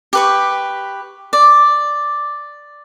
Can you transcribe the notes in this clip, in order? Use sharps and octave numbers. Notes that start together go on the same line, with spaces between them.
G4 B4 C#6
D5